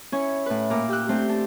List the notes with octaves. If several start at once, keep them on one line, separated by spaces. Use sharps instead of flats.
C#4 E4 C#5 C#6
A2 B4
A#2 A#4 D6
G4 E6 F#6
A3 C4 D4 G4 C5
D4 A5